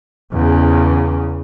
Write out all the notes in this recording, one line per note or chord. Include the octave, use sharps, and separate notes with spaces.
E2 C#3